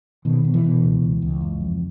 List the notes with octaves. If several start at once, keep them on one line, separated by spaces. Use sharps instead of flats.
B2 D#3
B2
E3
B2
C#2
C#2
C#2
F#1
F2